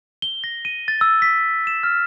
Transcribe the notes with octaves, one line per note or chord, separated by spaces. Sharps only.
G7
A#6
D#7
A6
E6
B6
E7
F6